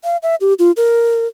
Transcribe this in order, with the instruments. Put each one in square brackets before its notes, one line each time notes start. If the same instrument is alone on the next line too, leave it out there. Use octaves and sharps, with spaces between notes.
[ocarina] F5
E5
G4
F4
A#4